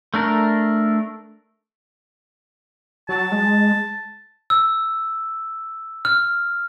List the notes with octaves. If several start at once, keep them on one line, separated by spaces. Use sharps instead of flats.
A3 D4 A#4
F#3 A5
G#3
E6
F6